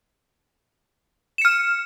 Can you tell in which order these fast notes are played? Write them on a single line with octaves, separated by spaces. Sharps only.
E7 C#7 F6